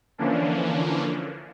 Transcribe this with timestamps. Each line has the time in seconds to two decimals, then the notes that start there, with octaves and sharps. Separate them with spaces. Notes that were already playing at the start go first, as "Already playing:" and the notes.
0.18 D3 E3 F3 A#3 C#4 D4